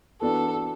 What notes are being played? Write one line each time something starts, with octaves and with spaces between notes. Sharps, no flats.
E3 B3 D4 F#4 A4